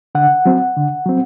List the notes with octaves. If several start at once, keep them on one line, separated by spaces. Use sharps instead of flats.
D3 F#5
F#3 C4
D3
F#3 C4